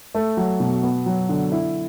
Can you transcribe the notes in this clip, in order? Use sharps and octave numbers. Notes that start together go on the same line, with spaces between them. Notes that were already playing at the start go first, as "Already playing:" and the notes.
A3
F#3
B2
B3
F#3
D3
E4